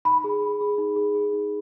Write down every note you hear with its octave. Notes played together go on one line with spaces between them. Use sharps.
D#4 B5
G#4
G#4
G#4
D#4
G#4
G#4
D#4